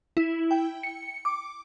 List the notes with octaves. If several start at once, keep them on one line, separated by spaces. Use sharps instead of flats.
E4
G5
C#7
D6